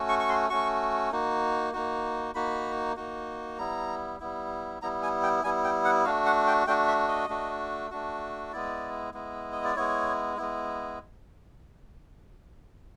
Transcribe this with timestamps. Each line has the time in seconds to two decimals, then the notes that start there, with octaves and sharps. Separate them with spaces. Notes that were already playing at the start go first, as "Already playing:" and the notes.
Already playing: A3 C#4 F#4
0.09 C#6
0.20 C#6
0.29 C6
0.50 A3 C#4 F#4 C#6
1.12 A#3 D#4 F#4
1.73 A#3 D#4 F#4
2.35 A#3 D#4 F#4 B5
2.96 A#3 D#4 F#4
3.58 G3 B3 E4 A#5
4.20 G3 B3 E4
4.82 G3 B3 E4 A#5
5.03 G#5
5.23 G5
5.44 G3 B3 E4 G#5
5.64 G5
5.85 F#5
6.05 A3 D4 F#4 F5
6.26 F#5
6.47 G5
6.67 A3 D4 F#4 G5
6.88 E5
7.08 D#5
7.29 A3 D4 F#4
7.91 A3 D4 F#4
8.52 G#3 B3 E4 D5
9.14 G#3 B3 E4
9.52 D#5
9.64 D5
9.76 G#3 B3 E4 C#5
10.37 G#3 B3 E4